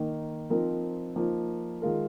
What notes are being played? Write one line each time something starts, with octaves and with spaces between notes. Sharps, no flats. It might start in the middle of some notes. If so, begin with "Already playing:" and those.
Already playing: D#3 A#3 D#4
F3 C4 D#4 A#4
F3 A#3 D#4
D#3 G#3 F4 A#4